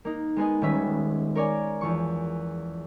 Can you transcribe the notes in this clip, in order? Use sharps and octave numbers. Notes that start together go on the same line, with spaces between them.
A#3 D#4
G#3 B3 G#4 D#5
D#1 D#3 B3 C#4 E5 B6
A#4 C#5 D5 G#5
E2 F3 C#6